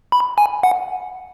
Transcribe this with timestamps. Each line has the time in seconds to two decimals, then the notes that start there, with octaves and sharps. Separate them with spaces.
0.12 B5
0.38 G#5
0.63 F#5